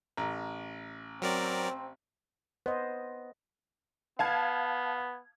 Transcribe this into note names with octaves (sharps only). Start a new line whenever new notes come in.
A1 A#5
F#3 C4 A#4 D5
B3 C5 D#5
B3 F5 A5 G#6